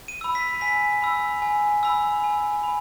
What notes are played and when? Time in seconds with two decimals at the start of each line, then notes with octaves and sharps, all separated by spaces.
0.08 D#7
0.21 B5 E6
0.35 B6
0.61 G#5 B6
1.02 B5 E6
1.42 G#5
1.83 B5 E6
2.24 G#5
2.63 B5